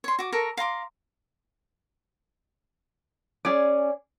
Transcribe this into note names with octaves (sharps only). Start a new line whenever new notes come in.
C#5 C6
F#4 D6
A4 A#4 A#5 C#6
F5 A#5 C6 D6
C#4 G#4 D5